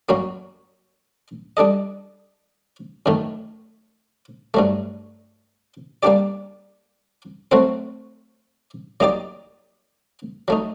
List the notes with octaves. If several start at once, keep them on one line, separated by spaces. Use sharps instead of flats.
F#2 F#3 A#3 F#4
G3 D4 A4 D#5
F#2 D#3 A3
G2 F#3 A3
G3 A#3 D4 G4 D5
F#3 A3 C4 F#4 C5
F#3 A#3 D#4 G4 D5
F#3 A3 D#4